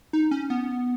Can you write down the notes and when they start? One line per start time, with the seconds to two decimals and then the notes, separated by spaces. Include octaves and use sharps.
0.13 D#4
0.31 C#4
0.50 B3